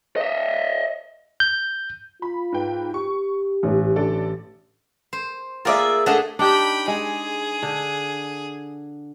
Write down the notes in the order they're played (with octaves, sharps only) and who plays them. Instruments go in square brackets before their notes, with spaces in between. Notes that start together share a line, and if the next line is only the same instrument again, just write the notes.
[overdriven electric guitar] D#5 E5
[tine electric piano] G6
[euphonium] F4 [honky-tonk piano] B5
[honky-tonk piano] G#2 B4 G5
[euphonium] G4 [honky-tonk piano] C#6
[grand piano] A1 [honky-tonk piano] G#2
[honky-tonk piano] D3 A4 D5
[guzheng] C5
[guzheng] A#3 G#4 A#4 [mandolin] F4 D5 E5
[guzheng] A3 D4 G#4 [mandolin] A4 D#5 F#5
[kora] D4 D#4 G4 [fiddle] G5 B5
[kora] G#3 [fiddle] G#4
[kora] D3